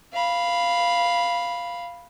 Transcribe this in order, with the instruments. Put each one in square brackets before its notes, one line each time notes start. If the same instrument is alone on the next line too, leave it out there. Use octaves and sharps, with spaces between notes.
[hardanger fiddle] F5 B5